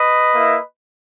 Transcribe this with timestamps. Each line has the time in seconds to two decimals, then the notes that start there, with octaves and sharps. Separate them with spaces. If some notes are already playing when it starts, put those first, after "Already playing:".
Already playing: B4 D#5
0.34 A#3 E4